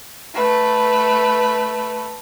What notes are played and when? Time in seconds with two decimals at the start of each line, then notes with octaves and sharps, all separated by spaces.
0.34 A3 B4